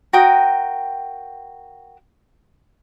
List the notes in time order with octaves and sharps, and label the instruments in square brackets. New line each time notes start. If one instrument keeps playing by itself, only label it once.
[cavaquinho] F#4 A#4 G5 D#6